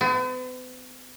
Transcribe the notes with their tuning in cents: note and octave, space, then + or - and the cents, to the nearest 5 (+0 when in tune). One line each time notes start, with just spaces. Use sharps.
B3 +45